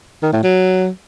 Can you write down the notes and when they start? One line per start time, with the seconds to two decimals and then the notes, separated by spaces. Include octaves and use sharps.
0.22 D#3
0.33 A2
0.43 F#3